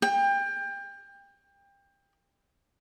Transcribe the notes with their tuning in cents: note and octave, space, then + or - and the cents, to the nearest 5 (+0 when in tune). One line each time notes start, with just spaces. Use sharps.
G5 +25